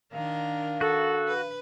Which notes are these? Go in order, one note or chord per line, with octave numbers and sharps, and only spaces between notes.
D#3 D4 A#4 F5
F#4 A4
B4